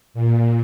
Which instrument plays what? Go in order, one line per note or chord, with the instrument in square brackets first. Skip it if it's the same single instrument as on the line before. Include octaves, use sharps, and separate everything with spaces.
[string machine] A#2